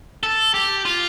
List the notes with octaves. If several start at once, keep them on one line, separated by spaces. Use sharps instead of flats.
A4
G4
F4